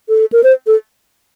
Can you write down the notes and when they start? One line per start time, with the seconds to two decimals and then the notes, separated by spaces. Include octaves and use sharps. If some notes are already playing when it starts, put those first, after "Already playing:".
0.09 A4
0.32 A#4
0.43 C5
0.67 A4